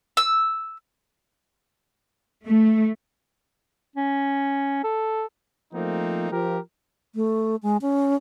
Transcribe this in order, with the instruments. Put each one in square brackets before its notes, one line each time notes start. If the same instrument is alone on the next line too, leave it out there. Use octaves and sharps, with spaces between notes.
[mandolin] E6
[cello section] A3
[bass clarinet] C#4
A4
[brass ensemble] F3 A3 A#3 C4 D#4
F3 F4 G4 A#4
[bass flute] A3
G#3
C#4